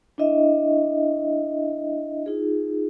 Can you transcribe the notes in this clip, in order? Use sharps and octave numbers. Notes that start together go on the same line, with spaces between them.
D4 E4 D#5 E5
D#4 F4 G#4